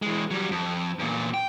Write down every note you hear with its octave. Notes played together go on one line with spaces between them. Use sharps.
E3 G#3
F#3 G3
F2
E2 A#2
G5